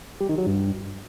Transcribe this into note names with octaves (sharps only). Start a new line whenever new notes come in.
G3
D#3
F#3
G2